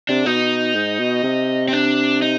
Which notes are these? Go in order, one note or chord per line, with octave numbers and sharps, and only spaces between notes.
C3 D4
B2 D#4
G#2
B2
C3
C4
D4
D#4